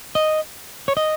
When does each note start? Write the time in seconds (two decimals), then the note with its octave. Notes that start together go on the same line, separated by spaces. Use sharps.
0.15 D#5
0.88 C#5
0.97 D#5